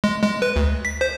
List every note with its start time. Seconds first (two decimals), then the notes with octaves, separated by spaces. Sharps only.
0.04 G#3
0.23 G#3
0.42 B4
0.56 D2
0.85 B6
1.01 C5